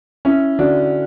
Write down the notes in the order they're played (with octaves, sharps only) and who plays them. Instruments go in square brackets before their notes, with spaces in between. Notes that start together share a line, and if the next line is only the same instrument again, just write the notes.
[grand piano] C#4 E4
D3 D4 F#4